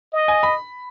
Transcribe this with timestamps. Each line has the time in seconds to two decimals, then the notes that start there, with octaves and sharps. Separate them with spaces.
0.13 D#5
0.28 G#5
0.43 B5